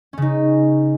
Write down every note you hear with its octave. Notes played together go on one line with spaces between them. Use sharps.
C#3 C#4 D#4